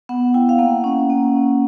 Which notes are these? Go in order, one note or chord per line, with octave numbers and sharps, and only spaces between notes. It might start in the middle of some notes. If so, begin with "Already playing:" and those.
B3 F#5
E4 G5
F5
A#3 F#5
C#4
A#3